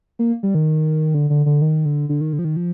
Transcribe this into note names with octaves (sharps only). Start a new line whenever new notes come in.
A#3
G3
D#3
D3
D3
D3
D#3
D3
D3
D#3
D3
F3
D#3
F3